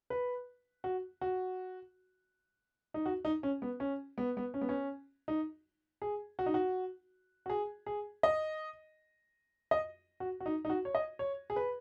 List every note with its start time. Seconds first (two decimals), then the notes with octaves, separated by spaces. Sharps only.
0.10 B4
0.84 F#4
1.21 F#4
2.94 D#4
3.06 F#4
3.25 D#4
3.43 C#4
3.62 B3
3.80 C#4
4.18 B3
4.37 B3
4.54 C#4
4.61 B3
4.69 C#4
5.28 D#4
6.02 G#4
6.39 F#4
6.46 D#4
6.54 F#4
7.46 F#4
7.50 G#4
7.86 G#4
8.23 D#5
9.71 D#5
10.20 F#4
10.40 F#4
10.46 D#4
10.65 D#4
10.70 F#4
10.85 C#5
10.95 D#5
11.19 C#5
11.50 G#4
11.56 B4